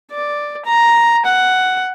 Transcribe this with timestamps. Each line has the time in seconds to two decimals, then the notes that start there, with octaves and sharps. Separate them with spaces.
0.11 D5
0.65 A#5
1.26 F#5